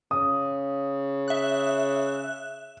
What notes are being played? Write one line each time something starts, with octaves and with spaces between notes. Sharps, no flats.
C#3 D#6
E5 F#6